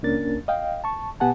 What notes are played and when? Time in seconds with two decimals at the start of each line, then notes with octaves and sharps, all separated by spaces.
0.03 C#2 A#3 C#4 D4 A#4 A6
0.48 D#5 F5 G5
0.84 A5 C#6
1.20 B2 B3 G4 F#5 G#5 A5